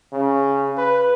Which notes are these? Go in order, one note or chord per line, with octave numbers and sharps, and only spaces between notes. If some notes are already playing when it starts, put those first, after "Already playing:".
C#3
B4